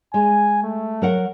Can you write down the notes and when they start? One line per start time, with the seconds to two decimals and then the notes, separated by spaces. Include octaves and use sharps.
0.14 G#3 G#5
0.63 A3
1.02 F#3 A#4 F#5